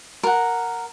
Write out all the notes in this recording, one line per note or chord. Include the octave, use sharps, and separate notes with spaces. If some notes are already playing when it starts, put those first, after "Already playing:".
A#4 F#5